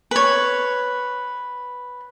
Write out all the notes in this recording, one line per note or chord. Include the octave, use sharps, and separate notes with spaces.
B4 C#5